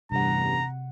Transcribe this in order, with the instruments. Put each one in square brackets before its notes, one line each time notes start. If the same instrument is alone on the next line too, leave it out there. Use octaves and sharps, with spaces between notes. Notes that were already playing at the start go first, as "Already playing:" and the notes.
[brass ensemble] A1 E2 G2 [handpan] C3 F#5 [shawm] A#5